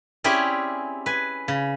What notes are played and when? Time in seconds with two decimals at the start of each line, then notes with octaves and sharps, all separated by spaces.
0.24 C4 C#4 E4 G4 G#4 D5
1.06 B4 G#5
1.48 C#3